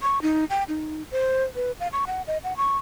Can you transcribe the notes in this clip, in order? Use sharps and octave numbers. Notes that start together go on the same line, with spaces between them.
C#6
D#4
G5
D#4
C5
B4
F5
C#6
F#5
D#5
F#5
C#6